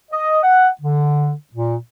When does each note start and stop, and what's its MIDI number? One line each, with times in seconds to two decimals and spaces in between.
0.11 0.38 75
0.43 0.68 78
0.81 1.32 50
1.53 1.75 46